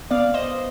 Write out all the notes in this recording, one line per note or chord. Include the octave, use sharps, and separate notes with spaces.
B3 D5 F5
C5 D#5